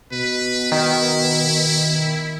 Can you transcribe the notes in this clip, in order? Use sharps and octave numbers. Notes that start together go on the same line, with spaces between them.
B2 B4
D#3 E4